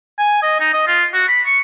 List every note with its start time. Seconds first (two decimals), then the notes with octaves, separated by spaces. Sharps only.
0.19 G#5
0.43 D#5
0.61 D#4
0.73 D#5
0.87 F4
1.13 F#4
1.29 B5
1.46 C#6